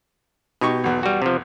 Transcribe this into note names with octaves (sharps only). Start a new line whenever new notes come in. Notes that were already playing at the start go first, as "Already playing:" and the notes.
B2 D#4 G4 C#6
B1 E2
G3 F#4
C3 F3